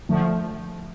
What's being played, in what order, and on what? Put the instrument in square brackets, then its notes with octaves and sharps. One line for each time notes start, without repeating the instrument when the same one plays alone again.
[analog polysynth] D3 F3 A3